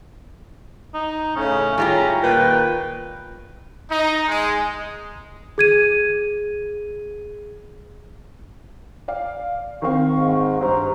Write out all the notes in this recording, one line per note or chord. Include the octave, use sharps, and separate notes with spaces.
D#4
A2 C#3 C#4
G3 G#3 C#4 E4 F4 G4 A#5
A#2 D#3 B4 G5
D#4
G#3
G#4 G#6 D#7
D5 F5
D#3 C4 F5 C#6
G#2
G2 C5 A#5